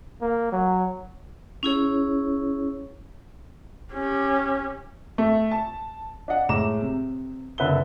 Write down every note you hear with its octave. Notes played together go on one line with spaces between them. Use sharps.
A#3
F#3
C#4 E4 G#4 C#5
C#4 G4
A3
A5
D4 D#5 F#5
A2 G#3 A#5 D6 E7
C3
F#1 D3 B4 E5 G7